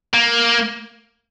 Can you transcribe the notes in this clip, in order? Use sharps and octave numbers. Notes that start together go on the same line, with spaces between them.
A#3